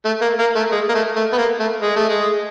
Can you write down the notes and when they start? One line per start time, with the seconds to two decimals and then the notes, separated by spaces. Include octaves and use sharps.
0.05 A3
0.22 A#3
0.39 A#3
0.56 A3
0.72 G#3
0.89 A#3
0.94 A3
1.16 A3
1.33 B3
1.38 A#3
1.60 A3
1.82 G#3
1.96 A3
2.09 G#3